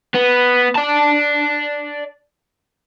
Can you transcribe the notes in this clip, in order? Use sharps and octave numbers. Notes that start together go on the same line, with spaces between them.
B3
D5 A5